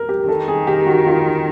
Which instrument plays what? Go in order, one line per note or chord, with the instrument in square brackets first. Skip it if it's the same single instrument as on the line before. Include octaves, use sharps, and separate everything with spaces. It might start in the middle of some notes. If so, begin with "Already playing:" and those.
Already playing: [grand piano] A#4
G4
[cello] D#3 [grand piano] A4
[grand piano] G#4
G4
F#4
F4